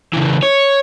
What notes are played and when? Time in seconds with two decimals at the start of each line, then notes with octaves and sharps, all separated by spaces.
0.14 C#3 E3
0.43 C#5